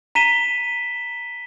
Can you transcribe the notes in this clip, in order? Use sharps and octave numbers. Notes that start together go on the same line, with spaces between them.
A#5 B6 D#7 E7 G7